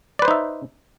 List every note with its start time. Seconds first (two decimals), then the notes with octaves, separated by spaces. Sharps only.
0.19 D5
0.22 B4
0.25 C5
0.28 D#4
0.31 E5